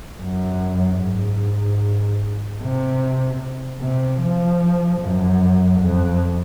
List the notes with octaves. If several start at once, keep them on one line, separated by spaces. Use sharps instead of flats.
F#2
G#2
C3
C3
F3
F#2
F2